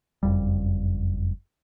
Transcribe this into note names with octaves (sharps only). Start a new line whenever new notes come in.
F#1 F2 G3